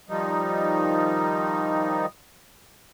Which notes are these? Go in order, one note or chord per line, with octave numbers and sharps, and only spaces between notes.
D#3 F3 G3 D#4